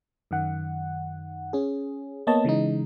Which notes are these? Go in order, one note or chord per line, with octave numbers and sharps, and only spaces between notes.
F#2 D#3 F#5
C#4 G#4
A#3 B3 C#5 D#5 A5
C#3 E3 G#3 D#4